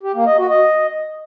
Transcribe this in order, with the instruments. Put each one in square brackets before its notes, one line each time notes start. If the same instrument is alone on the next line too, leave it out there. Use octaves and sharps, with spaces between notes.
[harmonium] G4
A#3
D#5
F#4
D#5